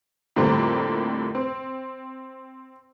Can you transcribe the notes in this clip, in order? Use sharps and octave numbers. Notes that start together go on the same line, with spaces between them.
F2 A2 D3 G3 A#3 C4
C4